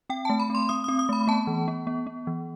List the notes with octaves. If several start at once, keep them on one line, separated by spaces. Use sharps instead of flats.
C4 G5
A5
A3
B5
C4 C6
C4 D#6
D#6
C4
D#6
A3 B5
B3 A5
E3
B3
B3
B3
E3